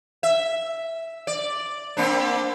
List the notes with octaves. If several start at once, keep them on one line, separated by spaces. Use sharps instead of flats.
E5
D5
A#3 C4 D4